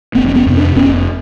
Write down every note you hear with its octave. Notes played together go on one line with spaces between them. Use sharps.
F1 A#3 C4
C4
B3 C#4
F2 C3
C4 D4
F1 B3 C#4